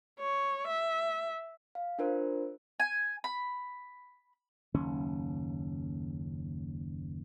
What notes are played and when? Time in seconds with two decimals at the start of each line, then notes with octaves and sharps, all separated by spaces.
0.20 C#5
0.67 E5
1.75 F5
1.99 D4 F4 A#4 C5
2.80 G#5
3.24 B5
4.74 F#1 D#2 C#4